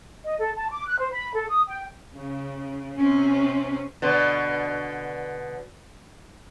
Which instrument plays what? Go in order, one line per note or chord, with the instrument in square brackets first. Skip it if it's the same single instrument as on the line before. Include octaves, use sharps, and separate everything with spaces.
[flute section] D#5
A4
A5
D6
F#6
C5
B5
A4
D#6
G5
[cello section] C#3
C3 C4 C#4
[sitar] B2 D3